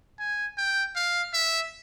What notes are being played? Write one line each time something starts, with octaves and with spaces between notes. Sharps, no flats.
G#5
G5
F5
E5